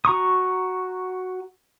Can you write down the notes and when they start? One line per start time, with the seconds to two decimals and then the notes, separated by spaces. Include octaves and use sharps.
0.05 F#4 A#5 C#6 D#6